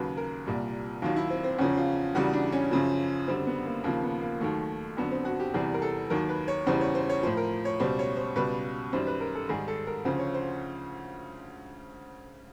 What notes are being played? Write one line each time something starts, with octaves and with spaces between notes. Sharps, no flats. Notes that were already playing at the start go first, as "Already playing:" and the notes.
Already playing: D#2 C#3 F#3 B4
A#4
C2 A#2 G3
D#2 D#3 F#3 F4
E4
C4
C4
E2 C#3 F3 C#4
F4
E2 C#3 E3 G3 F#4
D4
C#4
F#2 C#3 F3
F#2 D3 G3 C4
B3
A#3
D#2 C#3 F3 A#3
B3
A#3
D#2 D#3 F#3 A3
F2 D3 F#3 B3
C4
F#4
G4
E2 C3 E3 G3 G#4
A#4
A4
D#2 D#3 F#3 A#4
B4
C#5
E2 C#3 E3 G3 C5
C#5
C5
C#5
A2 F3 C5
A#4
C#5
C#2 B2 G3 C5
C#5
C5
C#2 B2 G3 B4
F#2 D#3 G3 C5
B4
A#4
A4
G#2 D#3 G3 G#4
A4
A#4
D2 C#3 F3 C5
C#5
C5